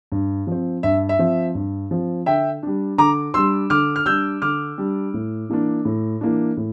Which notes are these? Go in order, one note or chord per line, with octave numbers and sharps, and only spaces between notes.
G2
F3 C4
G2 E5
E5
F3 C4
G2
F3 C4
D3 E5 G5
G3 D4
D3 A#5 D6
G3 D4 C6 E6
D3 D6 F6
F6
G3 D4 E6 G6
D3 D6 F6
G3 D4
A2
E3 A#3 D4
A2
E3 A#3 D4
A2